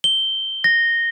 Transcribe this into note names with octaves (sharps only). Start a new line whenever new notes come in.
G7
A#6